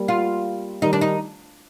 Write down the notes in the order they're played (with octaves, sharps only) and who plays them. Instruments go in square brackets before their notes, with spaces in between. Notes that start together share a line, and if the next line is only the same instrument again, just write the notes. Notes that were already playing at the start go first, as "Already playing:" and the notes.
Already playing: [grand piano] G3 A#3
[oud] F4
[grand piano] D#3 G3 [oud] D#4
[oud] D4
D#4